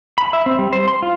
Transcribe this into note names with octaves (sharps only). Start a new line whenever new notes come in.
B5
E5
C4
G3
C5
C6
F4